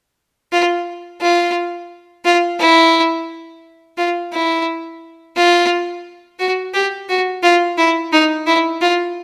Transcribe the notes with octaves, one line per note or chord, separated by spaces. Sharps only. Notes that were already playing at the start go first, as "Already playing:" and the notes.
F4
F4
F4
E4
F4
E4
F4
F#4
G4
F#4
F4
E4
D#4
E4
F4